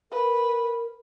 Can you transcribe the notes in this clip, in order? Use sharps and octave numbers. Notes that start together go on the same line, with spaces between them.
A#4 B4